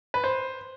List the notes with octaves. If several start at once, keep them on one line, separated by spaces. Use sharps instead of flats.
B4
C5